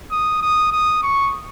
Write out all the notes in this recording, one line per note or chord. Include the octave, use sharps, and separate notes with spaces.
D#6
D#6
D#6
C#6